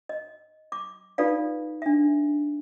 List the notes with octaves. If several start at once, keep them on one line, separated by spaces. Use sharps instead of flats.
D#5
D6
D#4 F4 A4 B4 D5 F5
D4 E5